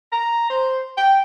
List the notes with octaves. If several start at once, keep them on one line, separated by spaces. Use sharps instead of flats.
A#5
C5
G5